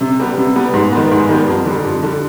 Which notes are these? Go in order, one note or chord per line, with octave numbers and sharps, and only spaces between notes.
C3
G3 B3
C3
G3 B3
G#2
D#3 G3 B3
G#2
D#3 G3 B3
F2
D3 G3
F2
D3 G3